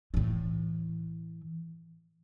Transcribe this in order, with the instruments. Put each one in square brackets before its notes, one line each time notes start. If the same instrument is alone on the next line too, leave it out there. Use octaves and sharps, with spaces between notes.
[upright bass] A2 E3